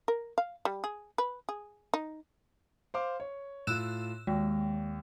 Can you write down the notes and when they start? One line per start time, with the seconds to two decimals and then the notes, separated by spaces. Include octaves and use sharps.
0.08 A#4
0.38 F5
0.65 G3
0.84 G#4
1.18 B4
1.49 G#4
1.94 D#4
2.94 C5 F5 D6
3.20 C#5
3.67 A2 F4 E6 F#6 E7
4.27 D#2 G#3